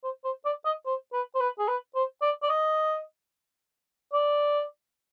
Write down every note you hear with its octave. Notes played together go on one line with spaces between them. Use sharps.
C5
C5
D5
D#5
C5
B4
C5
B4
G#4
B4
C5
D5
D5
D#5
D5